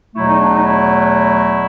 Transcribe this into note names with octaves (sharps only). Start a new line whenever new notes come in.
E2 B2 F#3 A3 E4
D#4
D4
D#4
E4